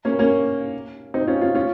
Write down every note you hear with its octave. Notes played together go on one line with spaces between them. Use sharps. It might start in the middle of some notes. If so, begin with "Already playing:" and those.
A#3 C#4
A#3 C#4
C4 D#4
C#4 F4
C#4 F4
C#4 F4